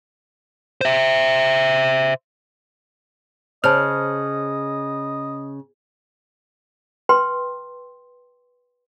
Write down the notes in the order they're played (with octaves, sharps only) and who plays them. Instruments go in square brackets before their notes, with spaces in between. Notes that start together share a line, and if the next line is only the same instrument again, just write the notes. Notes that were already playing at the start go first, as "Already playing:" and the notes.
[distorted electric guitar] C5 E5
[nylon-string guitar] C#3 [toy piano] C5 C#5 A5 [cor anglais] D#5 [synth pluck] F6
[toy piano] B4 G5 C6